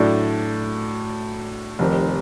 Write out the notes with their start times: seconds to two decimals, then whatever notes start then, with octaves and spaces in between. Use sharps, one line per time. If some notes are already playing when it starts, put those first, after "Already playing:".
Already playing: A2 F#3 A3 D4
1.79 F1 F2 C3 D#3